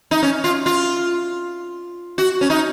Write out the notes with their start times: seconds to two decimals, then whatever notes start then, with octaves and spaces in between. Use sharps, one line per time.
0.11 D#4
0.23 C#4
0.44 F4
0.66 F4
2.18 F#4
2.41 C#4
2.50 D#4